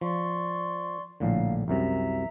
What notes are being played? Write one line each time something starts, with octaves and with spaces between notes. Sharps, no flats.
F3 D5 C6 C#6
A#1 A2 D3 F5
C2 F#2 C3 E5 A#5